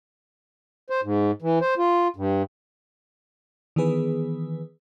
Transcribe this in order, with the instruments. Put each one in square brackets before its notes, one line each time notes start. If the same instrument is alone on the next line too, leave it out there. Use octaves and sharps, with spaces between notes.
[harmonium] C5
G#2
E3
C5
F4
G2
[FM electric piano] D#3 E3 B3 G#4 B4